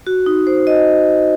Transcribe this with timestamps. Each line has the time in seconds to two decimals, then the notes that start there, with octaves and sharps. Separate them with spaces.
0.07 F#4
0.26 D#4
0.47 C5
0.67 D#5